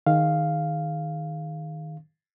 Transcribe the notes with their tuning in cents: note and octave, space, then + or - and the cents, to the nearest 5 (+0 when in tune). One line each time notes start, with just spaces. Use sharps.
D#3 +0 G#4 +0 F5 +0